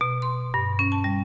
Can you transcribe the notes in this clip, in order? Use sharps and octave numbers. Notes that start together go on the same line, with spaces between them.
B2
C6
G2
C#4
A5
G3